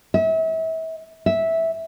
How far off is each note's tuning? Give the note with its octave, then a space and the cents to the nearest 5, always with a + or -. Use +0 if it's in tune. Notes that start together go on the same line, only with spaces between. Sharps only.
E5 -35
E5 -10